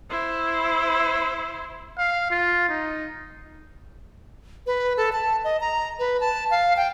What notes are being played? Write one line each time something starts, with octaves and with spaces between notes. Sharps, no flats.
E4 C5
F5
F4
D#4
B4
A4
A5
D#5
A#5
B4
A5
F5
G5